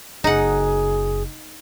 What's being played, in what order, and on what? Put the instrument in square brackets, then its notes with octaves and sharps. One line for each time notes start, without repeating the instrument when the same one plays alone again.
[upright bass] F#1 [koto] D#4 F#5 [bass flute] G#4